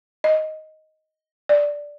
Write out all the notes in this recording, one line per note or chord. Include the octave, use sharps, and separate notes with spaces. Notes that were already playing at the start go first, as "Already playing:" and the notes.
D#5
D5